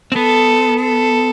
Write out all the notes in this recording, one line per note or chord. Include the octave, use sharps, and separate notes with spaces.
C4
B3 A4
A4